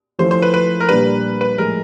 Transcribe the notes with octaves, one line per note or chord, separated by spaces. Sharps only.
F3 A3 C#4 E4 C5
C5
B4
B4
A#4
A#2 G3 A#3 D4 B4
B4
A2 F3 G#3 A#4